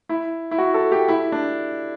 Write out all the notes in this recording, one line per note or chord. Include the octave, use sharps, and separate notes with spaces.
E4
E4
F#4
A4
G4
E4
D4